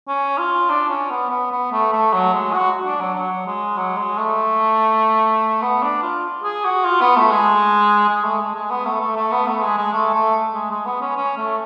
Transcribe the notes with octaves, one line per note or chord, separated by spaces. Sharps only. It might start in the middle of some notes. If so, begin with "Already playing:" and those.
C#4
F4
D4
C#4
B3
B3
B3
A3
A3
F#3
G#3
F#4
D4
F#3
F#3
G#3
F#3
G#3
A3
B3
D4
F4
G#4
F#4
F4
B3
A3
G#3
G#3
A3
G#3
G#3
B3
A3
A3
A3
B3
A3
G#3
G#3
A3
A3
G#3
G#3
B3
C#4
C#4
A3